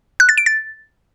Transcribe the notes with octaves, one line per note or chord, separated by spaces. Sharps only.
F#6
A6
D7
A6